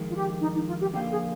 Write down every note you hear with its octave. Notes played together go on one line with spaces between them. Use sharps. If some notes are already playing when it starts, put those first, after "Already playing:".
Already playing: F2 D#3 G#3
F4
G4
D#4
D#4
F4
G4
F2 D3 F3 A#3 F4 G4
G#4